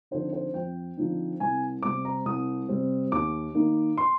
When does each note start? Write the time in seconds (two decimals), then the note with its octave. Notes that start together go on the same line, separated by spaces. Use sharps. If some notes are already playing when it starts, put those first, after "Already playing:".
0.11 D3 F3 C4 D#4 C5
0.33 C5
0.54 F2 G5
0.97 D3 F3 C4 D#4
1.40 C2 G#5
1.83 C3 G3 C4 D6
2.05 A#5
2.26 C2 D#6
2.69 C3 G3 C4
3.12 D#2 D6
3.55 D#3 A#3 D#4
3.98 C6